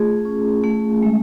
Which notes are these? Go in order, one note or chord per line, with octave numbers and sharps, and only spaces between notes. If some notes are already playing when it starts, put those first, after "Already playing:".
Already playing: A3 F4 G#4
C#4
A3
G#3